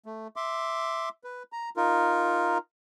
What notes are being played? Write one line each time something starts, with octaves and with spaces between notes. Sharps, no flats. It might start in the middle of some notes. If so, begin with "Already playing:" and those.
A3
E5 C6 D6
B4
A#5
D#4 F4 A#4